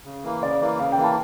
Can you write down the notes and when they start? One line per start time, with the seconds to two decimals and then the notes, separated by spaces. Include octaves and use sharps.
0.05 C#3
0.24 E3 A#3
0.42 C#3 D5
0.61 E3 A#3
0.80 C#3 F5
0.92 G5
0.98 E3 A#3
1.04 A5